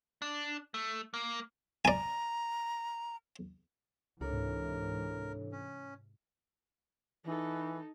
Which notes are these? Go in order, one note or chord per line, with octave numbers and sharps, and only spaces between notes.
D4
A3
A#3
D5 G#5 A#5
C#2 G#2 C3 E3 D4 A4 A#4 C#5
C#4
E3 D#4 A4